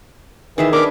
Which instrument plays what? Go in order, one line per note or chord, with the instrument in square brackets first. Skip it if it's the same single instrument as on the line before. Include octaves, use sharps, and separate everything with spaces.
[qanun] D#3 G#4 E5 [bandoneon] E3
[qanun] D4 B4 [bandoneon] A#4 A#5 D6